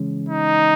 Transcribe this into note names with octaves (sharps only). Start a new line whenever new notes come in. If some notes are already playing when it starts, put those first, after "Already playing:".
Already playing: C#3 E3 G#3 C#4
D#4